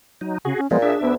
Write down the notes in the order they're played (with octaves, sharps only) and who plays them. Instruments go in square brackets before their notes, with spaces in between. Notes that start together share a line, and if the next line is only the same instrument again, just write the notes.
[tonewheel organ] F#3 D#4
[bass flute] C#3 [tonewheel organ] F#4 G#4
[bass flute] C#4
[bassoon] A#2 [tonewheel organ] F3 G#3 B3 [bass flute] F4
[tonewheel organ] D4 E5 [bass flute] G#4
[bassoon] D2 [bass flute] B3